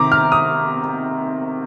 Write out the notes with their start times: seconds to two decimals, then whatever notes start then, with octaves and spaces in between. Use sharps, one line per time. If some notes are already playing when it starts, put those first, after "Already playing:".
Already playing: C3 D#3 A#5 D6
0.12 F6
0.32 D#6